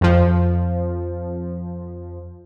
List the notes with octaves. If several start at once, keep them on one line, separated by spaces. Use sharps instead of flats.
F2 F3